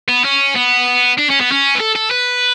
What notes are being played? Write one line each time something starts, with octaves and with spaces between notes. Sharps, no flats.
B3
C#4
B3
D4
C#4
B3
C#4
B4
A4
A4
B4